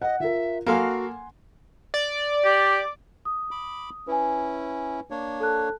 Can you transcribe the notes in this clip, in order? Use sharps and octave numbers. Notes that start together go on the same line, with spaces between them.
D#5 F#5
F4 A#4 E5
A#3 F#4 A4 F5 F#5 G#5 C6
D5
G4
D#6
B5 D6
C#4 E4 B4 G#5
A#3 D4 C#5
A4 A5 F#6